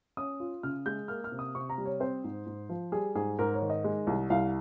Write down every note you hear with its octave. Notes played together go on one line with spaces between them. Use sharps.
C#4 D#6
F4
C#3 F6
G#3 G6
A#3 F6
F6
C3
D#6
C3 C#6
A#5
G3
C#5
C4 C5
G#2
G#2
F3
G3 G#4
G#2 G#4
G#2 A#4
C#5
D#3
D#5
G#3
C2
C2 F5